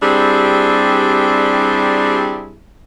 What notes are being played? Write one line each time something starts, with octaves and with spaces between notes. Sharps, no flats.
G3 C4 D4 E4 G4 G#4